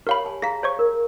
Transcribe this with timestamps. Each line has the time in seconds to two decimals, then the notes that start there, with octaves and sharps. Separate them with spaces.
0.07 G4 A#4 C#5 F5 B5
0.24 G#5 A5
0.42 G#4 F5 A#5 A#6 B6
0.63 C5 C#5 C#6
0.79 A#4